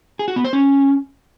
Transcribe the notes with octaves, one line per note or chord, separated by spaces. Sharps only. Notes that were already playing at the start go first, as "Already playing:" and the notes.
G#4
F#4
B3
C5
C#4